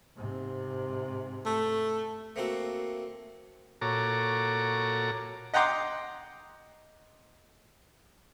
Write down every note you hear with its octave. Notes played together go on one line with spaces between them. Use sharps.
G#2 C3
A3
A3 A#3 C4 F#4 A4
A#2 F#4 A4 C#5 A#5 D6
D#5 F#5 G5 A#5 C6 D6